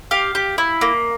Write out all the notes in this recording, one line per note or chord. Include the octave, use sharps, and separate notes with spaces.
G4 F5
G4
E4
A#3